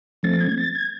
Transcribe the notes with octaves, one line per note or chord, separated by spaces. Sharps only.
F3 A3 C4 A6
G#6
A6
G#6